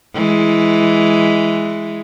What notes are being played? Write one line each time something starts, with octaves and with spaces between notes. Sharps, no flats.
E3 G#3